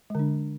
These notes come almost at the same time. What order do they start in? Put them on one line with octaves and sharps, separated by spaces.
G#3 D3 D4